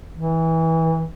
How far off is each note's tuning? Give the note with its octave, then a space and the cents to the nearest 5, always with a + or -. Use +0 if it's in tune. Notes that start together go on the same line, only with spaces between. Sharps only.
E3 -20